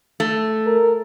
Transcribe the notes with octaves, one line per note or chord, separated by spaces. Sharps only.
A3
A#4